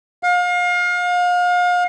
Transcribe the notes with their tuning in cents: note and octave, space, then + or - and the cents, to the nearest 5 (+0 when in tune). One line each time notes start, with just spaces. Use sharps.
F5 +35